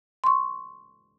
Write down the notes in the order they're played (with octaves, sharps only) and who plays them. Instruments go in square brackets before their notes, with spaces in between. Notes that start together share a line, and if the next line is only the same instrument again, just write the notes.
[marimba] C6 C#6